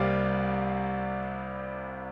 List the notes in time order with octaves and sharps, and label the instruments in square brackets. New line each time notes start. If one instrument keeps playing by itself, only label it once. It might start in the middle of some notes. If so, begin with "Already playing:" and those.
Already playing: [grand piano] C2 C3 G3 A#3 D5 F5 G5